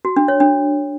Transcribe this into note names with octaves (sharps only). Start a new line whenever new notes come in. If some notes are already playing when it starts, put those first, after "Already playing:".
F#4
D4
C#5
D4